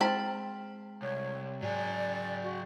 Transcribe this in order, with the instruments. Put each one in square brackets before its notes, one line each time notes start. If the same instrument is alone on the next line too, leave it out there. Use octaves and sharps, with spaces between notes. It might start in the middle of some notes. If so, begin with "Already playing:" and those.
[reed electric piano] G#3 F6 [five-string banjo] C4 A5 B5
[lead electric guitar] C2 [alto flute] C#5
[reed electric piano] G#2 [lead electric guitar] F#3 G#4 [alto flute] D5
[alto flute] F#4